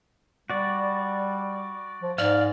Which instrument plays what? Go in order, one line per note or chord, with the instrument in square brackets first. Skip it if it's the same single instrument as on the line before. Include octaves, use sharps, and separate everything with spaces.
[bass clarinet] G3 [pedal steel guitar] F#4 D5
[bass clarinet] F3
[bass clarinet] G#2 [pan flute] D5 [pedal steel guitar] F5